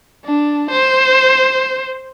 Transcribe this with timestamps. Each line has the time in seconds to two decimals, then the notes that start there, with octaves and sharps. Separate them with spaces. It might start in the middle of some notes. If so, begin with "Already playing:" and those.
0.24 D4
0.71 C5